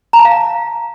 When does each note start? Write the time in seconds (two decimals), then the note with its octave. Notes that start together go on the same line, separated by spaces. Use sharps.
0.13 A#5
0.19 A5
0.25 F5